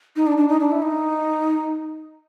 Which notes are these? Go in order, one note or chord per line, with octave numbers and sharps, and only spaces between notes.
D#4
D4
D4
D#4
D4
E4
D#4